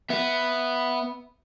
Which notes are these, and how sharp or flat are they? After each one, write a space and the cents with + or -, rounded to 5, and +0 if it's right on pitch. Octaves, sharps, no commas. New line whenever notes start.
B3 +0 E5 +0